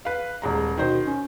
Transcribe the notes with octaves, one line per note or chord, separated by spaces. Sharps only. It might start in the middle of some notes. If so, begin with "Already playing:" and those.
B4 F5
D#1 G#3 A#5
B2 D#3 C5
C#4